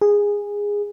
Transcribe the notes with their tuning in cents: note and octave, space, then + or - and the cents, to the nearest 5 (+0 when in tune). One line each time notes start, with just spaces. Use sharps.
G#4 -15